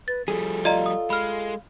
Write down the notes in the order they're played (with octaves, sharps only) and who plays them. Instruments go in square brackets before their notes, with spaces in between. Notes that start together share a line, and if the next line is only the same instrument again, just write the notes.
[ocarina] B4 [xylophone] A6
[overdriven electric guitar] F3 G3 [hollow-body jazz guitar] G#4 [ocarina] A4
[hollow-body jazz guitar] F4 [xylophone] D5 D#5 A#5
[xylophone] D#6
[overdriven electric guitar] G#3 [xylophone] B5 F6